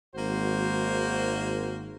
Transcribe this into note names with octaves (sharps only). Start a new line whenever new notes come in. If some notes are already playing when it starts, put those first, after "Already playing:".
G#1 A#3 F#4 C5